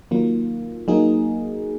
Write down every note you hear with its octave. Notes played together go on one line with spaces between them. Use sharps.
D#3 F#3 A#3 F4
F#3 A#3 D#4 G#4